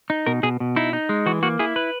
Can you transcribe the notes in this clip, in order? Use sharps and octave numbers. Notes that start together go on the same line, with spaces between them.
D#4
B2 A#4
B2 G#4
B2
D#4 E4
D#4
G#3
E3 F#4
A#3 F#4
E4 G#4
B4